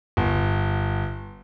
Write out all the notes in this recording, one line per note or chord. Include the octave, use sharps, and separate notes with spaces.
G1